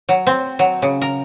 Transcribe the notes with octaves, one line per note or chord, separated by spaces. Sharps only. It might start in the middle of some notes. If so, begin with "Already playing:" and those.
F#3
C4
F#3
C#3
A#4